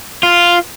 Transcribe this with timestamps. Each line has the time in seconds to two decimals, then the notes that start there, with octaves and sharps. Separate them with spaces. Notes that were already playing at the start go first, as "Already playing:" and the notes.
0.23 F4